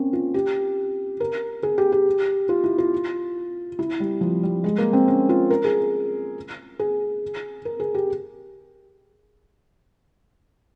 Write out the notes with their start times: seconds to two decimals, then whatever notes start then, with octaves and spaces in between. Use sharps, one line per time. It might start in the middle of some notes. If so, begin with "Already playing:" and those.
Already playing: A#3 C4 C#4
0.13 F4
0.34 G4
1.20 A#4
1.63 G#4
1.78 G4
1.92 G4
2.49 F4
2.64 E4
2.78 F4
3.79 E4
4.00 G3
4.21 F3
4.43 G3
4.64 G#3
4.78 A#3
4.93 C4
5.08 C#4
5.29 F4
5.50 A#4
5.65 G#4
6.79 G#4
7.65 A#4
7.80 G#4
7.94 G4